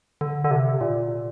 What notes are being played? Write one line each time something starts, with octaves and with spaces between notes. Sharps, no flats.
D3
D3
C3
A#2